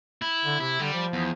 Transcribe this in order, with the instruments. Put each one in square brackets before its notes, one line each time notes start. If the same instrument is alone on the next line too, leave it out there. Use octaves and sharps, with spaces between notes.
[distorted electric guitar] E4
[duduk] D3
[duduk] C3 [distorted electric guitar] E4
[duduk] D3 [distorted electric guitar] G3
[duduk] F3
[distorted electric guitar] E2